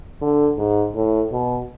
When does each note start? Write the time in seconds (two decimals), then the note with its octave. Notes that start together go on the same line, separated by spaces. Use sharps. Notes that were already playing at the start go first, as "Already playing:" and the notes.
0.22 D3
0.58 G#2
0.95 A2
1.32 B2